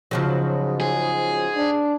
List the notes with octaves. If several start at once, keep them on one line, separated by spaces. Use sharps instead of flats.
G#2 C#3 F3 F#3
G#4
D4